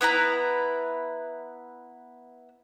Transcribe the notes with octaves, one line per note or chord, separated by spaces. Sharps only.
B3 E4 B4 A#5